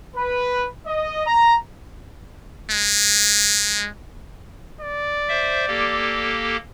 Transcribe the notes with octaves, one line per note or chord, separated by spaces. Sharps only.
B4
D#5
A#5
G#3
D5
C5 E5
A#3 G4 A4